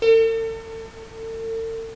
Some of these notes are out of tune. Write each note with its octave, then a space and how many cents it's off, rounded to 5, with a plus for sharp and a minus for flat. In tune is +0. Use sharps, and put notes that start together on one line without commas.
A4 +40